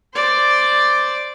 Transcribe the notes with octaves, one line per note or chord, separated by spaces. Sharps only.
C5 D5